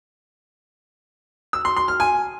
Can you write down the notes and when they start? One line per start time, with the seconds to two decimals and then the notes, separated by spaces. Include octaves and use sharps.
1.53 E6
1.65 C6
1.76 C6
1.88 F6
2.00 G#5